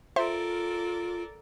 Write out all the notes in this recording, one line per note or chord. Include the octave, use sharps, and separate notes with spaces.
F4 A4 A#4 C5 D5 E5 C6